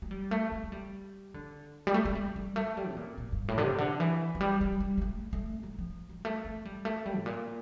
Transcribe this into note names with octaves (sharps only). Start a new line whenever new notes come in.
A3
G3
A3
A3
A3
G3
D3
G3
A3
A3
G3
G3
A3
G3
C3
A#2
A#2
G2
A2
D3
C3
D3
E3
F3
G3
G3
G3
G3
A3
A3
G3
F3
G3
A3
A3
G3
A3
G3
A2
A#2